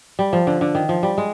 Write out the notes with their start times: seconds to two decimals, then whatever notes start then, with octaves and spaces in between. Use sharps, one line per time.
0.19 G3
0.33 F3
0.47 D3
0.61 D3
0.75 D#3
0.89 F3
1.03 G3
1.18 G#3